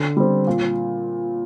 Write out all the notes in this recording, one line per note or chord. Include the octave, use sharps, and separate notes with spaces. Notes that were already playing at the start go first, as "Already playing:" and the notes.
Already playing: D3
G3 C4
A#2